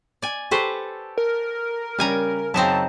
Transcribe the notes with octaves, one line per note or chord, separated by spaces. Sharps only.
D5 G#5
G4 A4 B4 C5 C#6
A#4
C#3 G3 C#4 G#5 A#5
F#2 C#3 C4 D#4 E4 A5